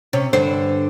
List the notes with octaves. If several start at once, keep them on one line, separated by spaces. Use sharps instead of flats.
C3 C#4
G2 D3 C5